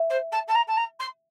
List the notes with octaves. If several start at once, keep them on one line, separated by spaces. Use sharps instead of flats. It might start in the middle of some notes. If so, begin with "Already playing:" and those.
Already playing: E5
C5
A5
A5
A#5
A5
A#5
C6